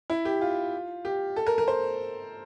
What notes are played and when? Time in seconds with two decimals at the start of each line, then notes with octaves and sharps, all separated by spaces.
0.10 E4
0.25 G4
0.41 F4
1.05 G4
1.36 A4
1.47 A#4
1.58 A#4
1.68 C5